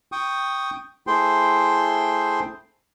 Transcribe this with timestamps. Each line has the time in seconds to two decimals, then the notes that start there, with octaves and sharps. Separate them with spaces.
0.12 G5 C#6 D#6
1.07 A3 E4 G#4 C5 G5 C6